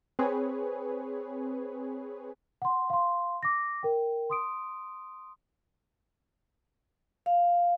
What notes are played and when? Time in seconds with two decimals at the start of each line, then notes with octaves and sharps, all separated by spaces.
0.19 C4 G#4 B4 C#5
2.62 F#5 C6
2.90 F5 C6
3.43 D6 A#6
3.83 A#4 G5
4.30 C6 D#6 D7
7.26 F5